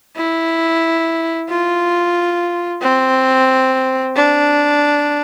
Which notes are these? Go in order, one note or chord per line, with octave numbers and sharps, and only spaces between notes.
E4
F4
C4
D4